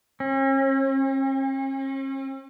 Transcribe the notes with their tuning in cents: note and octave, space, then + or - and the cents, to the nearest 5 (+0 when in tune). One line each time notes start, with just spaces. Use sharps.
C#4 -45